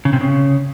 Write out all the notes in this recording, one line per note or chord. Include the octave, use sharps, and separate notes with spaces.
C#3
C3
C#3